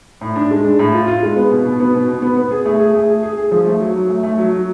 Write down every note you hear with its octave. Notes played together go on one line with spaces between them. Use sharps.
A2
D4
G#3
D4
A2
F4
F4
G#3
B3
B2
B2
B3
B2
B2
B3
B3
G#4
A3
G#4
A3
G#4
G#4
G#4
F3
A3
F#3
F#3
A3
A3
F#3
F#3